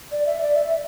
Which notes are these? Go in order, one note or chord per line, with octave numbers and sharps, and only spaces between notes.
D5
E5
D5
E5